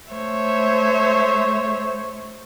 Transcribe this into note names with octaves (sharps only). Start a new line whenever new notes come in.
A3 C5 C#5 E5